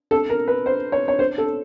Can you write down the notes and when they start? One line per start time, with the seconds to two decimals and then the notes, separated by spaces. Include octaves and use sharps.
0.11 A4
0.30 A#4
0.48 B4
0.66 C5
0.92 C#5
1.08 C#5
1.19 C5
1.38 A4